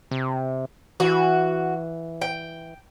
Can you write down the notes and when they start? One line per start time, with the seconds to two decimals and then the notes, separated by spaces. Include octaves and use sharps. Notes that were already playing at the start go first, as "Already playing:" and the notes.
0.11 C3
1.00 E3 F#4
2.22 G5